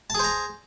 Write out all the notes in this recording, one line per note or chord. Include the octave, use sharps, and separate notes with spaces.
G#4 C5 A5 A#5